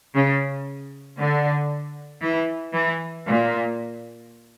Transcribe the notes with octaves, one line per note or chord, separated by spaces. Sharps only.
C#3
D3
E3
E3
A#2